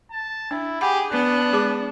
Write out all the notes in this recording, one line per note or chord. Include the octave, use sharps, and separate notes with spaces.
A5
D4 E4
G4 G#4 F#5 B5
B3 D4 F#6
G#3 G#4 D6